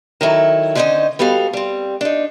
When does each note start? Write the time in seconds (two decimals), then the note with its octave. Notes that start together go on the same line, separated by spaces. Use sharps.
0.21 D#3 F#3 E4 A4
0.75 D3 C#4 D#4 E4 C5 D#5
1.19 G3 B3 F#4 A4 F5
1.53 G3 C4
2.01 D4 D#4